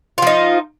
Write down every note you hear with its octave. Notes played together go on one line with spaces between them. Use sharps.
F3 D#4 F4